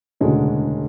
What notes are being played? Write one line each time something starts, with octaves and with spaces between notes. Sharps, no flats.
E1 D2 C#3 G#3 D4